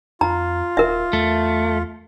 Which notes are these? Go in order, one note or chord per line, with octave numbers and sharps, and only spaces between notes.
F2 F4 A#5
D#1 A#4 E5
E2 A3